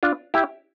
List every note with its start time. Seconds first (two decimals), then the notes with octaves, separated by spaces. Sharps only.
0.03 D4 F4
0.34 E4 G4